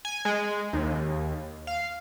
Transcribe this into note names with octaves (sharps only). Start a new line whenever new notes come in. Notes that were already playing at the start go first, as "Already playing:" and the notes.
G#5
G#3
D#2
F5